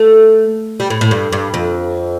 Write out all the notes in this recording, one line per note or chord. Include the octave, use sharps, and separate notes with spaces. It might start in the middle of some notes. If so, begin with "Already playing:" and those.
Already playing: A3
G3
A2
A2
G2
G2
F2